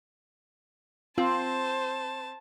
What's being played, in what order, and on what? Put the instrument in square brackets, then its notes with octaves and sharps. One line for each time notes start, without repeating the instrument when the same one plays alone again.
[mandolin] C4 [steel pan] F4 [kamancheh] C5 [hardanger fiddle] A5